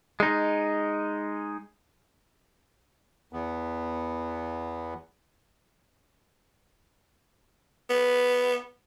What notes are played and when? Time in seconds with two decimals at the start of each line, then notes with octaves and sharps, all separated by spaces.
0.20 G#3 D#4
3.33 E2 B3
7.90 B3